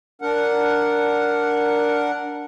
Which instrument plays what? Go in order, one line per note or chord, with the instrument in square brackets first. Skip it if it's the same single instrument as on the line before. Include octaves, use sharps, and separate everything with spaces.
[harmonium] D4 A#4 F#5